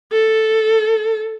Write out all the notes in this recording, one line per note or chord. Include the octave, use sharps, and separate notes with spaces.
A4